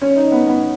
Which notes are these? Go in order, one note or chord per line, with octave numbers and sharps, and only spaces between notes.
C#4
D#4
B3
B3